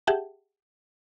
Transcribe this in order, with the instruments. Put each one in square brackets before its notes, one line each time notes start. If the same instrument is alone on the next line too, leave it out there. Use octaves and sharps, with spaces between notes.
[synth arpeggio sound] G4 G#4 E5 F#5 G5 A5